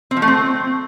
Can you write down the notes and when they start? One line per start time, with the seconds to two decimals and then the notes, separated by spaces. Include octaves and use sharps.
0.11 C4
0.17 F3
0.22 A3
0.28 C4